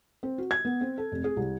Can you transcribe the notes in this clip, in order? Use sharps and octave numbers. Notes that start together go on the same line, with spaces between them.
C4
F#4
G#6
B3
C4
A4
F1
G#4
C2